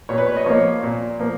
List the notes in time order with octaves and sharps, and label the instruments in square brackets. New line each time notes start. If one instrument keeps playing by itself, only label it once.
[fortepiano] A#2 C#5
B4
C#5
D#5
F3 A#3 C#5
A#2
F3 A#3